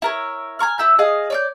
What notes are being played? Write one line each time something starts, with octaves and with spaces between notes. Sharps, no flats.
E4 A#4 C#5
G#5 A#5 C#6 F6
E4 E5 G6
G#4 D#5 F5
C#5 D5 G6